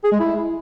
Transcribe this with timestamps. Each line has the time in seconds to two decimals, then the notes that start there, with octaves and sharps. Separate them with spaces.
0.04 G#4
0.12 G#3
0.20 E4